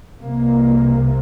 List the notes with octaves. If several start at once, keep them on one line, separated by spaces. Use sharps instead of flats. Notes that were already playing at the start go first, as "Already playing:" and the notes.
C2 C3 A#3